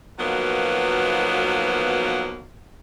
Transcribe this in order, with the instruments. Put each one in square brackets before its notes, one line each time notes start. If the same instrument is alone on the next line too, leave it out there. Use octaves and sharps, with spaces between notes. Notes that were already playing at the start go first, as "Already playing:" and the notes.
[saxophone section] B2 D#3 F3 F#3 A#3 B3